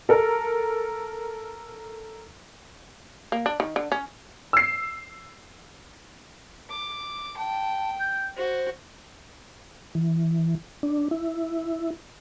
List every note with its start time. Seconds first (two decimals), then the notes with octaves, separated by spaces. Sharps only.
0.09 A4 A#4
3.32 A#3
3.46 D4
3.60 D#3
3.76 D3
3.92 C#4
4.53 E6 C7
6.70 D6
7.37 G5 A5
8.00 G6
8.37 F#4 C5
9.95 E3
10.83 D4
11.11 E4